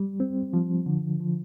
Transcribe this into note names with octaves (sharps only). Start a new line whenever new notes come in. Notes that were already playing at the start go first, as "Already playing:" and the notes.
Already playing: G3
C4
F3
D3
F3